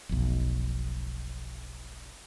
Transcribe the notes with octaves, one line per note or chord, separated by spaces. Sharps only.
F1 B1